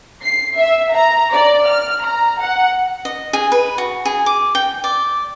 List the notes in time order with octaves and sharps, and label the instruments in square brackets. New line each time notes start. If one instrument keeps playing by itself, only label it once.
[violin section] C7
E5
A#5
D5
F6
A#5
F#5
[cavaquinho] D#5
G#4
B4
F#4
G#4
D6
G5
D5